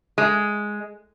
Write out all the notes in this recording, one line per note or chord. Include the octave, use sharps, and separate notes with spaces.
G#3